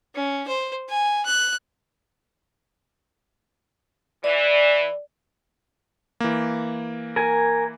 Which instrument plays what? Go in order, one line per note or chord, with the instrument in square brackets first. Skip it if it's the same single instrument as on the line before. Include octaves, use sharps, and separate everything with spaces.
[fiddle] C#4
C5
G#5
F#6
[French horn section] E3 [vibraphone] D5
[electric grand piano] E3 A#3
[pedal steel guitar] A#4 G#5